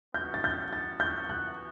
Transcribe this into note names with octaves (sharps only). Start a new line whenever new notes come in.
E3 B3 F#4 G6
A6
G6
A6
G6
F#6